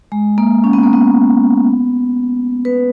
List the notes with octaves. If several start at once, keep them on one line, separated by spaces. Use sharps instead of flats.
G#3
A#3
C#4
B3
A#3
B3
B4